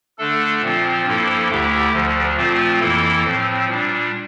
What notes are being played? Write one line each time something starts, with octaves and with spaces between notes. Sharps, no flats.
D3 A3 D4 A4
A#2 F3 C4 F4
G2 F3 A#3 E4 A4
D2 D3 A3 E4 G4
D2 D3 F3
A#2 F3 A3 C4 F4
F2 E3 A#3 E4 A4
A2 F3 C4
A#2 G3 D4